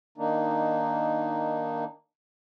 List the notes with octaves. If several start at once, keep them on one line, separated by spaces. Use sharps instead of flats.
D#3 A#3 D4 D#4